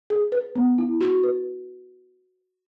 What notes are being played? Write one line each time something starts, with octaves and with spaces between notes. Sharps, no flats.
G#4
B4
B3
E4
F#4
B4